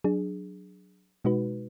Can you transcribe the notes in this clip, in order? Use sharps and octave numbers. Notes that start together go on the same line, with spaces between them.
F#3 D4 G#4
B2 G#3 D#4 F#4 B4